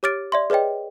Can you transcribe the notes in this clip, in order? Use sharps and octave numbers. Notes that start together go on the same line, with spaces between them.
G4 C#5 D6 F6 A6 D7
D5 E5 C6
G#4 B4 C#5 D#5 G5